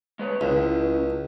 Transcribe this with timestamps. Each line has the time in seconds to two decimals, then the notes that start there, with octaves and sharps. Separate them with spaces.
0.19 G#3 B4 C#5
0.41 C#2 C#4 E4